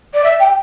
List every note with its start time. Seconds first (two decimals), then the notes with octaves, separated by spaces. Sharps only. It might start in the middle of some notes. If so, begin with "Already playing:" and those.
0.14 D5
0.24 E5
0.40 G5